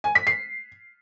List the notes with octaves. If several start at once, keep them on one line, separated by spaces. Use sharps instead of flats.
G#5
B6
C7